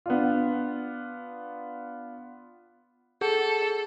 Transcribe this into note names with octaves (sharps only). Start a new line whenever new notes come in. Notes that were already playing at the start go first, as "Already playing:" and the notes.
B3 D4 F4
G#4 A4